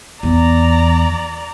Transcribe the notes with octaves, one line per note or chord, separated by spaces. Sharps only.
E2 D5 A#5